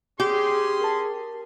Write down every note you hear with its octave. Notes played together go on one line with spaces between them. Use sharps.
C#4 G4 G#4 C6
A#4 A5